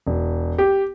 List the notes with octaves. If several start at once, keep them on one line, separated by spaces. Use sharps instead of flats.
E1
G4